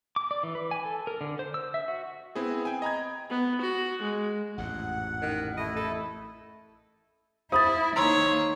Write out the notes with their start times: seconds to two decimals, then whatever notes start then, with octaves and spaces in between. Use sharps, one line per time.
0.16 D6
0.31 D5
0.43 E3
0.55 B4
0.71 G#5
0.85 A4
1.07 A#4
1.21 D3
1.39 C5
1.54 E6
1.74 E5
1.88 F#4
2.35 B3 C4 E4 G#4
2.65 G5 G#5
2.82 D#5 A#5 B5 G#6
3.30 B3
3.61 F#4
4.02 G#3
4.58 A1 F2 G#2 F#5
5.22 D#3
5.57 A3 E4 D#5
5.77 A4
7.52 E4 C5 B5 D#6 A6
7.96 D#3 A#3 C#5 A#5 C6 E6